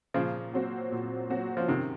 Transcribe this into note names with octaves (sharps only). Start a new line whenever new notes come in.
A#2 C#3 F3
F#3 C4 F#4
A#2
F#3 C4 F#4
F3
F#2 C3 D#3